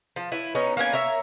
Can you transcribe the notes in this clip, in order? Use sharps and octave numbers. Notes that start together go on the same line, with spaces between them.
F3
E4 B4 C#5
B3 C#4 D#4
A#3 B3 C#4 G#5
A#4 C#5 E5